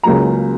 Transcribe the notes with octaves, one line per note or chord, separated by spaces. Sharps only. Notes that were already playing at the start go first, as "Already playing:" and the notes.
C#2 C#3 F#3 A#3 A#5